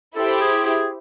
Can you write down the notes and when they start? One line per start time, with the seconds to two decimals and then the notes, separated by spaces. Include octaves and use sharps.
0.16 E4 G4 A4 C5
0.41 G#4
0.65 G#4